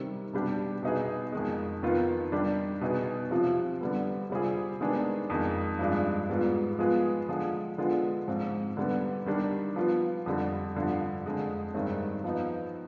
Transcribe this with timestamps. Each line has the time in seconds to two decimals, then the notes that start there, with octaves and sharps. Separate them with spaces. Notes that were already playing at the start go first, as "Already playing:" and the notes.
Already playing: C3 D#3 G3 C4
0.33 B2 G3 D4 G4
0.83 B2 B3 D#4 G#4
1.32 F2 D#3 G#3
1.83 F2 D#3 B3 F4
2.32 D#3 G3 D4 G4
2.81 B2 B3 D#4 G#4
3.31 C3 F3 C4 F4
3.81 D3 G3 B3
4.30 C3 G3 C4 F4 G#4
4.81 D#3 G#3 B3 D4 G#4
5.30 F2 D#3 G#3
5.79 G2 F3 G#3 D4
6.29 G#2 G3 B3 F4
6.79 F3 G#3 B3 F4 G#4
7.28 D3 F3 G#3
7.78 D3 G#3 B3 F4
8.27 G#2 F3 C4
8.77 D3 G3 B3
9.26 D#3 G3 D4
9.76 F3 B3 F4
10.26 F2 D3 G3
10.75 G2 D3 F3
11.26 F2 D3 G#3
11.74 G2 D#3 G#3 C4
12.24 F3 B3 D#4